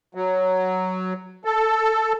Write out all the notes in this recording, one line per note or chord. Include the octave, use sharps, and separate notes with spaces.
F#3
A4